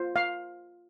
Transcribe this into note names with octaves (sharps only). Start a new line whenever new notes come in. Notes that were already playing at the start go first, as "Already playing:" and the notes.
Already playing: F4 C5
F5